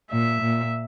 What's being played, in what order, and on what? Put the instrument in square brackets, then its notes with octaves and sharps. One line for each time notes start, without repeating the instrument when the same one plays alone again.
[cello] A#2 [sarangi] E5
[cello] A#2